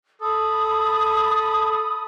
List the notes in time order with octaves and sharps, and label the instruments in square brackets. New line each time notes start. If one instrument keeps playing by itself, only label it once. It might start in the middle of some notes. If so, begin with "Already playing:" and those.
[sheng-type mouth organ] A4 [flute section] B5 D#6